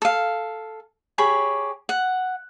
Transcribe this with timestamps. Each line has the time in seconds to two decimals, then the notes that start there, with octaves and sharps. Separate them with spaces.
0.02 A4 F5
1.18 G4 G#4 C#5 B5
1.89 F#5